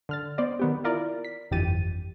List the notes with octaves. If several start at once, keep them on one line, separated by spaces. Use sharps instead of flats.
D3 F6 A6
B3 C5 D5 D#5
D#3 B3 G4
E4 F4 A#4 D5
B6
G1 F2 E3 G4 A6 D#7